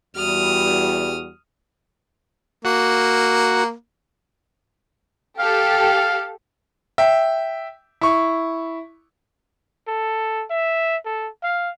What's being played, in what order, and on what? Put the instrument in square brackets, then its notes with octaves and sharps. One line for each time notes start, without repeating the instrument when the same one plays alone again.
[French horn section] E2 G3 F#4 [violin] D#6 F6
[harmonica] A#3 [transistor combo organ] F#4
[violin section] G4 A4 [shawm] F5
[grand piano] E5 G5
E4 C#6
[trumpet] A4
E5
A4
F5